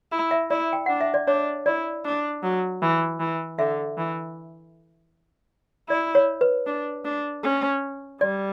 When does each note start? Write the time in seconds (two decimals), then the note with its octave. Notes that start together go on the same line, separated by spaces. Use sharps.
0.12 E4
0.31 E5
0.51 E4 D5
0.73 G5
0.86 D4 F#5
1.01 E5
1.14 D5
1.27 D4 C#5
1.66 E4 D5
2.05 D4
2.43 F#3
2.82 E3
3.20 E3
3.59 D3 E5
3.98 E3
5.89 E4 D5
6.15 C#5
6.41 B4
6.67 D4
7.05 D4
7.43 C#4
8.21 G3 D5